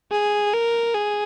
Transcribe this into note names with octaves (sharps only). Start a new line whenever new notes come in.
G#4
A#4
G#4